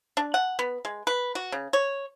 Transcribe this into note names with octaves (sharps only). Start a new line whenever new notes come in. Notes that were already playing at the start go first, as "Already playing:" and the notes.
D4
F#5
B3
G#3
B4
F#4
C#3
C#5